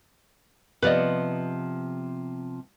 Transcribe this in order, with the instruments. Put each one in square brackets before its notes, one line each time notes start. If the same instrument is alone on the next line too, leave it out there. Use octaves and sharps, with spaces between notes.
[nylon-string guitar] C3 F3 B3 [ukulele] B4 D5 D#5